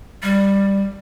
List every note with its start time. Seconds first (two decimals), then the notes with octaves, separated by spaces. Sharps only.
0.23 G3